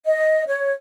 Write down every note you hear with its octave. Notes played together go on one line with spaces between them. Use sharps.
D#5
C#5